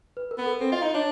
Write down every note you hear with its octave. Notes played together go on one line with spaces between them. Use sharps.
B4
A#4
B3
A4
C4 A4
F4 D#5
D#4 D#5
D4 C#5